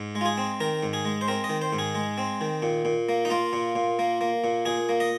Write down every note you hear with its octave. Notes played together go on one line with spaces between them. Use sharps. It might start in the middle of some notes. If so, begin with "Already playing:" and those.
Already playing: G#2
G#3
F4
G#4
C4
D#3 A#4
G#2
G#4
G#3
C5
C4 A#4
D#5
D#3
C5
G#2
G#4
G#3
C4
D#3
A#2
A#2
A#3
D#4
A#3 F4
A#2
A#2
A#3
A#3
A#2
A#2 G#4
A#3
D#5